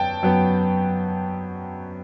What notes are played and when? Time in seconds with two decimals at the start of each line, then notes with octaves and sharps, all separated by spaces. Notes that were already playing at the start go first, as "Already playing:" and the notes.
Already playing: F#2 F#3 B3 G5 A5
0.23 F#2 F#3 B3